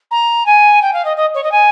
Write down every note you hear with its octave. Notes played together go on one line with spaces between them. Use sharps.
A#5
G#5
G5
F5
D#5
D#5
C#5
D#5
G#5